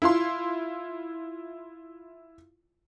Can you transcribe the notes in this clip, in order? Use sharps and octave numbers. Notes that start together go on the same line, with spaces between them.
E4 F4 C6